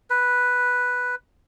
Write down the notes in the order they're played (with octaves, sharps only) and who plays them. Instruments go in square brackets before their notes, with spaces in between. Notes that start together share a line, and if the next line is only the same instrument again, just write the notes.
[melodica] B4